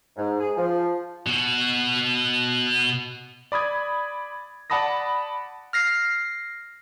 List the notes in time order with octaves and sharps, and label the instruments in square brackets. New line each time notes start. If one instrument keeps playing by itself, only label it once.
[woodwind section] G#2
G#4
F3
[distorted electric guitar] B2 F#4
[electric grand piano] D5 B5 D#6 G#6
D5 F#5 A5 B5 D#6 A#6
[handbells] F6 A#6 C7